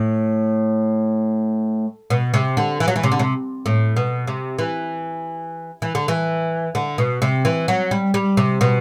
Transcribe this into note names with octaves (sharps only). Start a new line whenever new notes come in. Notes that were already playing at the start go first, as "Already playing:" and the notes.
Already playing: A2
B2
C3
D3
E3
F#3
E3
C3
D3
C3
A2
B2
C3
E3
E3
D3
E3
D3
B2
C3
E3
F#3
G3
G3
C3
B2